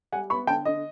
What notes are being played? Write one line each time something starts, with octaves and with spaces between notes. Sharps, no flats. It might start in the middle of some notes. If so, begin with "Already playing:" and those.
G3 F#5 G#5
B3 B5 C#6
D3 G5 A5
D3 D#5